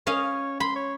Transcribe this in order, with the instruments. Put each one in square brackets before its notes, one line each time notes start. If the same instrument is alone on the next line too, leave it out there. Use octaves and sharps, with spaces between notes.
[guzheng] C#4 D#5 F5 [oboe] C#5
[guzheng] B5 [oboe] C6
[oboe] C#5